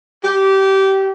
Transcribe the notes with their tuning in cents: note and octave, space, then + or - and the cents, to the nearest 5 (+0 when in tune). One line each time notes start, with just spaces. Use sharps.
G4 -20